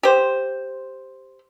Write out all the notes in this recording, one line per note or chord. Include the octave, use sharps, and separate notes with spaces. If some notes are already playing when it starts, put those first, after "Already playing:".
G4 C5